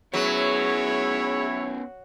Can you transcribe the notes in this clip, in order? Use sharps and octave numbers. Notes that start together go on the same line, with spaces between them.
F#3 B3 C#4 E4 G#4 C#5